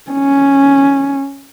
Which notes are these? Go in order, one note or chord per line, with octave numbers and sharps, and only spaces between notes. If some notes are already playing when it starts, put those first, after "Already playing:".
C#4